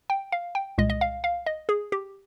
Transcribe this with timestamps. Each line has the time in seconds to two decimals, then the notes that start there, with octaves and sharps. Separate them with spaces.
0.10 G5
0.32 F5
0.55 G5
0.78 C2 A#2 G#3 D#5
0.90 D#5
1.01 F5
1.24 F5
1.46 D#5
1.69 G#4
1.92 G4